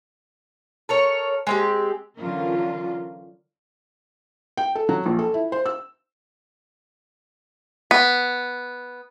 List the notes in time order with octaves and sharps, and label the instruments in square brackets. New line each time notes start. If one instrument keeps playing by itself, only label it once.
[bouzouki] A4 A#4 C#5
G#3 C4 G4
[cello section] D3 E3 F#3 C#4 F4 A#4
[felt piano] G5
A4
F#3
A#1
A4
E4
C5
E6
[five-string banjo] B3